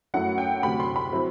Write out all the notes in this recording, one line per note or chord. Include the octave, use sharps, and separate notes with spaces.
F#2 F#3 A3 E4 F#5
G5
D2 C3 F#3 B5
C6
B5
F#3 C4 E4